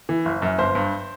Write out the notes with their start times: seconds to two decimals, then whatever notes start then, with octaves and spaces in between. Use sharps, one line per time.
0.09 E3
0.25 F#1
0.42 F#2
0.58 G1 C5
0.75 G2